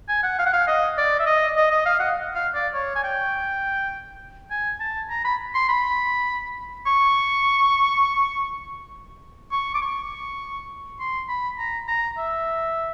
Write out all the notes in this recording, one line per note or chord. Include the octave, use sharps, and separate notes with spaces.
G#5
F#5
F5
F#5
F5
D#5
D5
E5
D#5
D#5
D#5
F5
F#5
F5
D5
C#5
G#5
G5
G#5
A5
A#5
B5
C6
B5
C#6
C#6
D6
C#6
C6
B5
A#5
A#5
E5